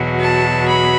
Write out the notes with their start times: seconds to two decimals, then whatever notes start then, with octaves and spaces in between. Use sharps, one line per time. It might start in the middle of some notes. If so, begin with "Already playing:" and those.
Already playing: E2 B2 F#3
0.20 A5
0.68 B5